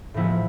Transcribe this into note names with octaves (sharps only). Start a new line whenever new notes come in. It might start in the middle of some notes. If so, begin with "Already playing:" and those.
A2 F3 G#3 B3 E4